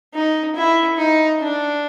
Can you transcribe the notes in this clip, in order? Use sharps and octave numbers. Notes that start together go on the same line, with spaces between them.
D#4
E4
D#4
D4